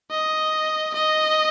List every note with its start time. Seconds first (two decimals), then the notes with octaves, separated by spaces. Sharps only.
0.11 D#5
0.94 D#5